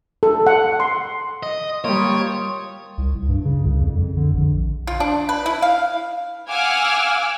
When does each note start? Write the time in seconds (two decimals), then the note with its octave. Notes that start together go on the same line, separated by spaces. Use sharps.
0.23 A4
0.47 F#5
0.80 C6
1.43 D#5
1.84 G3 A#3 F4 C#5 G5 D#6
2.98 C2
3.14 C2
3.28 G2
3.45 C#3
3.65 C2
3.81 F2
3.95 F2
4.16 D3
4.33 A#1
4.87 F4
5.00 D4
5.29 B4
5.46 E4
5.62 F5
6.49 F5 F#5 G#5 D6 E6 F6